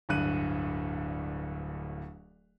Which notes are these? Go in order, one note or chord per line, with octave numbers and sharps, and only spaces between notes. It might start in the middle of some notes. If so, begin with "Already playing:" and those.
D1 D2 G2 F#6 D#7